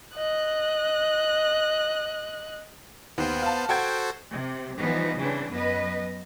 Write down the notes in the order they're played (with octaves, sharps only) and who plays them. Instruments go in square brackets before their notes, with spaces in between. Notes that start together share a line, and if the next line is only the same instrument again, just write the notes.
[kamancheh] D#5 F#6
[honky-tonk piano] D#2 [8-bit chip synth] B3 C5
[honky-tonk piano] F5 A5
[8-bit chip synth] F#4 A4 C5 [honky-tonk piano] F#5 G5 G#6
[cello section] C3
E3 F3 G3 B3 D#4
C#3 E3 C4 D4
F#2 B3 B4 D#5